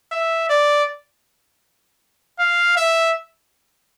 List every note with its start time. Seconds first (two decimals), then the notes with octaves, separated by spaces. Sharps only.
0.12 E5
0.49 D5
2.39 F5
2.77 E5